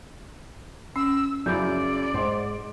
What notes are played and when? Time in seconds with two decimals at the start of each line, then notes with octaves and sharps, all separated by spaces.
0.96 C#4 E6
1.46 F#2 C#3 E4 D5 G6
2.14 G#2 G#3 C5 C6